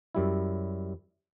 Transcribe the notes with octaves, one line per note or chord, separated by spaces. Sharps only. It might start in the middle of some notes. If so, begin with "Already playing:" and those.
F#2 G3 E4